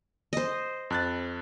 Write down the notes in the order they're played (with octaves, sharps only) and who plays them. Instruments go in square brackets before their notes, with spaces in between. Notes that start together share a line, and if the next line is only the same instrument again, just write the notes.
[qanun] C5 D#5
[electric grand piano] F2 F#6 A6